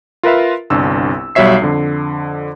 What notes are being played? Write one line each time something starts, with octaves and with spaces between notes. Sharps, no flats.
F4 A#4 B4 E5 F5
G1 C2 D4 E6
B1 G3 F#4 C#5 E5 C7
F2 D3